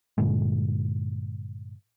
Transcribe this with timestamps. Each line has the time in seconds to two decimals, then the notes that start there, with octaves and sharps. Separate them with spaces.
0.18 G2 A#2 D3 G#3